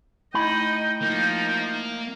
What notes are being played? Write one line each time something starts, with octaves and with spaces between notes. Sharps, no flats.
A3 D#4 E4 D#5 G5 B5
F3 A#3 D#4